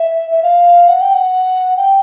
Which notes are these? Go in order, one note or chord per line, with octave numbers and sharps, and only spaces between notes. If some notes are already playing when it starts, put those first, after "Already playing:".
Already playing: E5
E5
F5
F#5
G5
F#5
G5